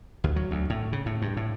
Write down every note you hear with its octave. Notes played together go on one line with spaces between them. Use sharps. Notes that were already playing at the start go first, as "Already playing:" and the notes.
D2
F#3
D2
A2
C#3
A2
G2
A2